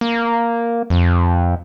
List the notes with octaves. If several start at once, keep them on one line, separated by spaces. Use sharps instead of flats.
A#3
F2